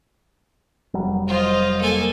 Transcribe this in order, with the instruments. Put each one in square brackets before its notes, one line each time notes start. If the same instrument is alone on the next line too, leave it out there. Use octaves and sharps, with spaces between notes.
[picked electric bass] F1 F#3 G3
[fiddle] F4 [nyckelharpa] C5 D#5
[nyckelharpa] A#3 [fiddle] A4 G#5